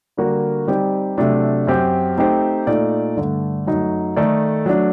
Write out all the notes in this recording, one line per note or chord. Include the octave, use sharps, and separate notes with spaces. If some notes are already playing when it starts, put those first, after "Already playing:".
D3 G3 A#3 F#4 A#4
G3 C4 D#4 G4 D5
C3 F#3 A3 D4
F#2 F#3 C4 G4
A3 C4 D#4 G4 C5
A#2 A3 D#4 A4 D5
G2 D3 A3 D4
F#2 F#3 A3 D#4
D#3 A3 D#4 A4 D5
F#3 A3 D4